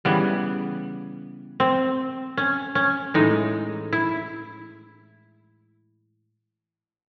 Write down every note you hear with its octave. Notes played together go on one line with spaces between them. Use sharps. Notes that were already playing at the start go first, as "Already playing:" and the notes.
C#3 E3 G3 B3
C4
C#4
C#4
A2 E3 G#3 D#4
E4